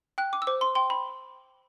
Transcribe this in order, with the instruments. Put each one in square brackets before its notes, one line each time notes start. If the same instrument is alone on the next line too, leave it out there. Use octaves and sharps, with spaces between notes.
[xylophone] G5 F#6
D6
E6
C5 D6
C6
G5 C6
B5